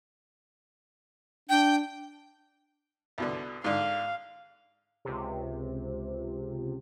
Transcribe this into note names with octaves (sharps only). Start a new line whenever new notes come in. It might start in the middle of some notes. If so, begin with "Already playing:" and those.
D4 G5
C2 B2 D3
G#2 D3 F5
C#2 C3